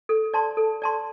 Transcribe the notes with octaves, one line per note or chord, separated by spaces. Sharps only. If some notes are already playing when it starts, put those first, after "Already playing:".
A4
D5 A5 C6
A4
D5 A5 C6